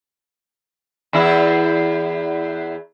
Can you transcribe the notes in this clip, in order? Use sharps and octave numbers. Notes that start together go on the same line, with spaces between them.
E2 E4